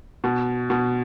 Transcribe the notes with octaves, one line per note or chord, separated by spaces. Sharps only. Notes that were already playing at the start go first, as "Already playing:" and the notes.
B2
B2